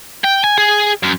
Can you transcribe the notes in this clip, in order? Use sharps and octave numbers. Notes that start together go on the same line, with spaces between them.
G5
G#5
G#4
F#2